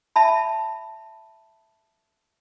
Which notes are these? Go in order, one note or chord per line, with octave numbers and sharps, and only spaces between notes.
E5 A5 B5